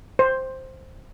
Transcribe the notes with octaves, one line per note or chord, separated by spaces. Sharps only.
C5